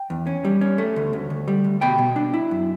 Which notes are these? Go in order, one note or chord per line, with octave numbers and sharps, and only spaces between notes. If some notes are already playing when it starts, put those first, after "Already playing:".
Already playing: G5
E2
C#4
G3
C#4
A3
D2
D2
D2
G3
D2
B2 G5 B5
B2
D4
E4
F#2